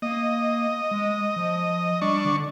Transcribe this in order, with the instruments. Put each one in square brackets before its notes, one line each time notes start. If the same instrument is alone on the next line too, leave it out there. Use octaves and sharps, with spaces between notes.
[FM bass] A#3 [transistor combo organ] D#5
[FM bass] G#3
F3
[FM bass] G3 [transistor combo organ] D4 C#6
[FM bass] D3